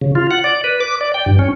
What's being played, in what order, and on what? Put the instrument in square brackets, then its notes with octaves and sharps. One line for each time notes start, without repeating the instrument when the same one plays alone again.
[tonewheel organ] C#3
F4
F#5
D5
B4
D6
D5
G5
G2
C#4